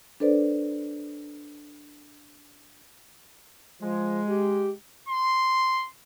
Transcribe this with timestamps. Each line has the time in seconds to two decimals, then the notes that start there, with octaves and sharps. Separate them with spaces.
0.20 D4 A4 B4 C5 D5
3.82 F3 G#3
4.28 G4
5.09 C6